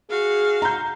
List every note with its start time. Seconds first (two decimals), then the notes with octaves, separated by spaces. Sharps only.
0.10 F#4 G#4 F5
0.62 A#5 G6